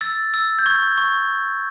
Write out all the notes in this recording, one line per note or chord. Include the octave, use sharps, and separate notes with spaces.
E6 A6
E6
G6
C#6 G#6
C#6